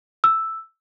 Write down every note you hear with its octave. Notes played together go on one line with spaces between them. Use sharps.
E6